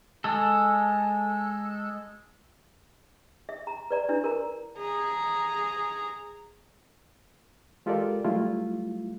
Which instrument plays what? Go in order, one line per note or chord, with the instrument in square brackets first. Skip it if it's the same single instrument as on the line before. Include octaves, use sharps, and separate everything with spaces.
[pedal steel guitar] G#3 A4
[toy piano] E5
A#5
B4 D5 A#5
D4 E4 B4
A#4 A#5
[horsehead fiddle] G#4 A#5
[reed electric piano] G#3 F4 G4 A4 A#4 D5
F#3 G3 A3 E4 F4